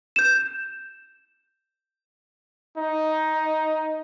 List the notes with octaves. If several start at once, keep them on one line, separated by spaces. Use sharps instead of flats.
G6 E7
D#4